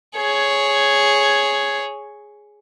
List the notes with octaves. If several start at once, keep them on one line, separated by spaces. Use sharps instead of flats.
G#4 C#5